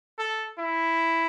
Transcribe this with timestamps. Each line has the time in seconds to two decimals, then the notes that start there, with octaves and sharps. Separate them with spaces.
0.19 A4
0.58 E4